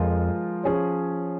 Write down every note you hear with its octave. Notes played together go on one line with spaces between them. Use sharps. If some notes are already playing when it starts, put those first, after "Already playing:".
Already playing: F2 F3 G#3 F4 A#4
F3 C#4 G#4 C#5